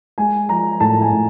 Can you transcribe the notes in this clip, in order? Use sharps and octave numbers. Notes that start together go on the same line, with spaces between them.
G#3 G#5
F3 A#5
A2 A5
G#5
A2